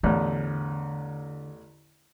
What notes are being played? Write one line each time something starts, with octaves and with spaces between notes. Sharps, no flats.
A1 E2 A2 D3